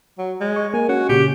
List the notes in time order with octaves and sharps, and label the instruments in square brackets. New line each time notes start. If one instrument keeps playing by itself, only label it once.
[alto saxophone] F#3
G#3
[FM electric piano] C#6
[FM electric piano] A#3 [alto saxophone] G#5
[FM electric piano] C#4 [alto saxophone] F#4
[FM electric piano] A#2 C#3 [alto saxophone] G4